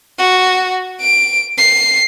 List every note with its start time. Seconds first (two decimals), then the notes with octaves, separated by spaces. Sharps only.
0.18 F#4
1.01 D7
1.58 C7